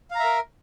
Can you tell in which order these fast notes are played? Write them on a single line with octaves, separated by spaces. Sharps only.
F5 A#5 E5 A#4